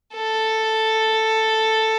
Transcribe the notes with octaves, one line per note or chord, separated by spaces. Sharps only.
A4